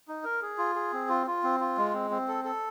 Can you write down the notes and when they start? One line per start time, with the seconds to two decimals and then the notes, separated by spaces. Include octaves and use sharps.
0.08 D#4
0.24 A#4
0.42 G#4
0.58 F4
0.75 G#4
0.93 C4
1.09 F4
1.27 F4
1.44 C4
1.60 F4
1.77 G#3
1.94 C4
2.11 C4
2.28 A4
2.45 A4